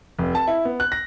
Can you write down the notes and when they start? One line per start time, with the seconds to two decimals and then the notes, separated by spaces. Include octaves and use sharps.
0.19 F1
0.35 A5
0.47 E4
0.65 B3
0.80 F#6
0.92 A#6